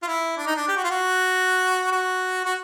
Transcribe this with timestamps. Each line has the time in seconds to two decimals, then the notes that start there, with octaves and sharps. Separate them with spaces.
0.02 F4
0.07 E4
0.37 D4
0.46 D#4
0.56 D4
0.68 G4
0.76 F#4
0.84 F4
0.90 F#4
1.92 F#4
2.45 F#4